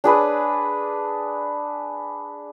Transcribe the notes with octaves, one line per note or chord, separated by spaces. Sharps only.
D4 G#4 B4